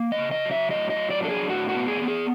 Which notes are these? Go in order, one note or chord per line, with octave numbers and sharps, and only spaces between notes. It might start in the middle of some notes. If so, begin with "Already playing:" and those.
Already playing: A#3
D#5
C#3
D#5
F#3
E5
A2 D#5
D#5
F#3
D5
D4 A4
G#4
A2 F#4
F#4
B3
G#4
B3
G#4